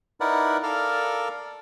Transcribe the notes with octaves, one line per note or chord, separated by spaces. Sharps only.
D#4 E4 A#4 B4 D5 F#5
A4 A#4 D5 F5